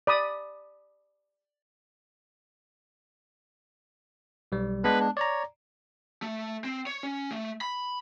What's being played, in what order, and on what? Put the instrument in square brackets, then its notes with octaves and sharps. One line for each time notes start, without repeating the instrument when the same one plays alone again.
[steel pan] D5 B5 D#6
[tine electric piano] B1 G3
[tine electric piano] G#3 B3 [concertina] D4 B4 B5
[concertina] D4
[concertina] C#5 [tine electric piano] D5 A#5
[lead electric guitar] A3
C4
C#5
C#4
A3
B5